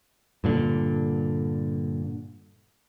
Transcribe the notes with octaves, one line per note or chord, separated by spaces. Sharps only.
G2 A#2 D3